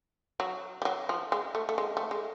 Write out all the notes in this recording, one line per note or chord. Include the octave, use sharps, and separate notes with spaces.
F#3
G3
F#3
F3
G#3
A3
A3
G#3
A3
G#3